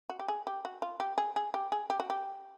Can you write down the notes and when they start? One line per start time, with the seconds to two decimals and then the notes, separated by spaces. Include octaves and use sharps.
0.09 F#4
0.19 G4
0.28 G#4
0.47 G4
0.65 F#4
0.82 F4
1.00 G4
1.18 G#4
1.36 G#4
1.54 G4
1.72 G#4
1.90 G4
2.00 F#4
2.10 G4